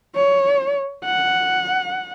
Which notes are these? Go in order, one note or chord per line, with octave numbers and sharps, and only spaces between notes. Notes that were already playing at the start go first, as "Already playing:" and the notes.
C#5
F#5